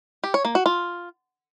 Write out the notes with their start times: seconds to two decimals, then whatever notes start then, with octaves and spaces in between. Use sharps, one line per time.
0.24 G4
0.34 C#5
0.45 A#3
0.55 F#4
0.66 F4